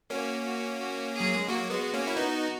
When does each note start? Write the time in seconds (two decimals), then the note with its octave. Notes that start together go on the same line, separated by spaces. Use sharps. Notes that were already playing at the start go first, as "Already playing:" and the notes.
0.10 A#3 C#4 F#4
0.45 F#4
0.79 F#4
1.13 G#4
1.20 F#3
1.34 G#3
1.48 F#3 A#3 F#4
1.70 G#3 B3
1.94 A#3 C#4
2.07 E4
2.16 B3 D#4